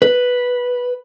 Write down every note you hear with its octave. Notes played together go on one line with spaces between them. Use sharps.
B4